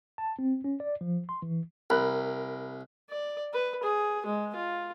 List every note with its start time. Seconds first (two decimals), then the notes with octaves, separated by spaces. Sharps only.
0.18 A5
0.39 C4
0.64 C#4
0.80 D5
1.01 F3
1.29 C6
1.42 E3
1.90 C2 A#4 B5 F#6
3.10 D5
3.53 B4
3.83 G#4
4.25 G#3
4.55 F4